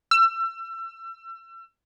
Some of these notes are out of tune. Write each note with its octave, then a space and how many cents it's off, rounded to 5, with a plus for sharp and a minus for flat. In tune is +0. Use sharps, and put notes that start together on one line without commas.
E6 +35